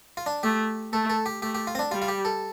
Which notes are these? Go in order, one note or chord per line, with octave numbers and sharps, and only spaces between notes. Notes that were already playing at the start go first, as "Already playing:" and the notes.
F4
D4
A3 G4
A3 A4
A4
G4
A3 G4
G4
F4
C4
D4
G3 F4
F4
G4
A4